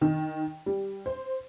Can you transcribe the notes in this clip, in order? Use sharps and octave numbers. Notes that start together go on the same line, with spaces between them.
D#3
G3
C5